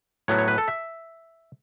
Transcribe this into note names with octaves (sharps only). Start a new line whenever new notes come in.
A2 F#3 B3 C#5
C#5
B4
A4
E5